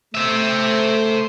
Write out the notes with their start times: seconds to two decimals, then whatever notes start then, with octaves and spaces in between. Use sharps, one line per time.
0.15 A3 C5 E5